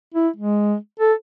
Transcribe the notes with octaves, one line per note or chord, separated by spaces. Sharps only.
E4
G#3
A4